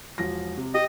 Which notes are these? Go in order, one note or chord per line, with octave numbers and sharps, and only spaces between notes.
E1 F3 A#6
C3
G4 D#5